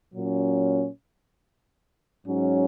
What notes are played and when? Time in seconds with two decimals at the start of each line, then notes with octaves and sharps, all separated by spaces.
0.14 A#2 F#3 C#4
2.26 G#2 F#3 C#4